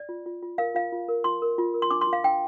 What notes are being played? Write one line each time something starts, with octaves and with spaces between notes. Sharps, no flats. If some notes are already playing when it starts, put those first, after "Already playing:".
Already playing: D5
F4
F4
F4
A#4 F5
F4 F5
F4
A#4
F4 C6
A#4
F4
A#4
C6
D4 D6
C6
F4
F5
D4 G5